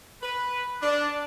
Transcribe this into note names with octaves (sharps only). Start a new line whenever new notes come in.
B4
D4